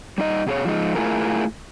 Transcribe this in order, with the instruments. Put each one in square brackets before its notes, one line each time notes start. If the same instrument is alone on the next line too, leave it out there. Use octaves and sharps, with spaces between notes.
[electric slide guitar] G3 D#4 D#5
B2 G#4 C#5
F3 G#3 D#4
A3 E4 F4 G#4 A#4